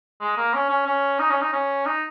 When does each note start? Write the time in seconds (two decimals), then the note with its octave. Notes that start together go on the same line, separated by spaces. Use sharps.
0.20 G#3
0.37 A#3
0.54 C#4
0.70 C#4
0.86 C#4
1.19 D#4
1.30 C#4
1.41 D#4
1.53 C#4
1.86 D#4